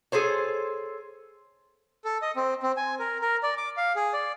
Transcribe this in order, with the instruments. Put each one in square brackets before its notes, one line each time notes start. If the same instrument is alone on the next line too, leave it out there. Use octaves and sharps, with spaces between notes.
[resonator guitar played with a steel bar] G#4 A4 C5 C#5
[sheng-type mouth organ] A4
D#5
C4
C4
G#5
A#4
A#4
D5
D6
F5
G#4
D5